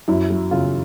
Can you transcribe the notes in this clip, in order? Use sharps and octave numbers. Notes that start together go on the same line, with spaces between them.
F#2 E4
F#3
C#3 F4